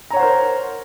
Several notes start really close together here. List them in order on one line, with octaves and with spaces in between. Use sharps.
A#5 C#5 F#5 C5 A#4